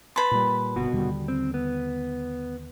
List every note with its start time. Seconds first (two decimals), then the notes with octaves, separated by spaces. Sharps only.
0.16 B4 A5 B5 C6
0.31 A#2 G3
0.76 G1 C2 B2 F#4
0.93 D#2 D3 G3
1.28 C4
1.54 B3